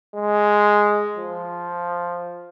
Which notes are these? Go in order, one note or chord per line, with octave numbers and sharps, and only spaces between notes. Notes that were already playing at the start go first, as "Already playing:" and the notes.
G#3
F3